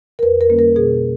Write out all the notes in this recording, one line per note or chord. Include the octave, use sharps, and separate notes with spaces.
A#4
F2 B4
A#4
D3 G3 A#3 C#4
A#4
B2 G#4